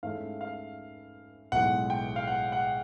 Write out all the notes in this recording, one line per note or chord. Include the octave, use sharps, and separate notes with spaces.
G#2 E3 A3 C#4 F5
F5
B1 A2 E3 G#3 F#5
G5
F5
F#5
F#5